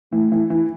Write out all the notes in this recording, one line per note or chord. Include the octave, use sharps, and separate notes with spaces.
E3 A3
E3
E3